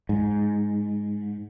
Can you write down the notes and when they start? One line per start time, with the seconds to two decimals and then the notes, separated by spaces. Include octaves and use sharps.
0.09 G#2